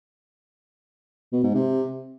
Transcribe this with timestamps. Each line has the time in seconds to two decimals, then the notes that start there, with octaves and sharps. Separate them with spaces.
1.32 B2
1.43 G#2
1.54 C3